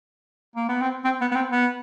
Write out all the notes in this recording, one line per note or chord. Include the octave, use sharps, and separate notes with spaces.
A#3
B3
C4
C4
B3
B3
C4
B3